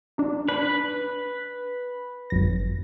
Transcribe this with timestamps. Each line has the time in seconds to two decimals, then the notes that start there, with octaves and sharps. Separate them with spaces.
0.18 D4 D#4
0.49 D4 B4
2.30 G#1 F#2 A#6